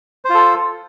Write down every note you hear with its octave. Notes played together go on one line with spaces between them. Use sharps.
F4 A4 C5